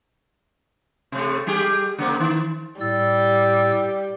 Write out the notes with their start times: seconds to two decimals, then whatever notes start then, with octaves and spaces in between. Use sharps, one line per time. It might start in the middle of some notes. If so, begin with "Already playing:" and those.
1.12 C3 A3
1.47 G3 G4 G#4
1.99 C#3 A#3 C4
2.20 D#3
2.80 A2 G3 E6 A6